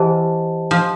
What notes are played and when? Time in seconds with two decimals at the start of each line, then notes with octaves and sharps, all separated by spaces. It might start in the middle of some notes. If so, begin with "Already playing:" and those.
Already playing: E3 G4 C5 D#5 F#5 A5
0.71 F3